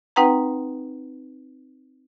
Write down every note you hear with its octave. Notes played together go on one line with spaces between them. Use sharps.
C4 D#4 B4 F#5 G5 A#5